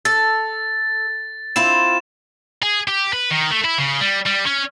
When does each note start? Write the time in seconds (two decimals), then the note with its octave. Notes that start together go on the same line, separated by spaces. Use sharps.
0.05 A4 A6
1.56 C4 E4 F4 E7
2.63 G#4
2.88 G4
3.13 B4
3.31 D#3
3.51 A3
3.65 E4
3.78 C#3
4.01 G3
4.26 G3
4.46 C#4